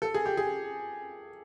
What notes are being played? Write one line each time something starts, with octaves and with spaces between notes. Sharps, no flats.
A4
G#4
G4
G#4